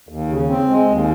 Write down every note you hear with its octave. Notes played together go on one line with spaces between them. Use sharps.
D#2
C#3
C4
G#3
D#2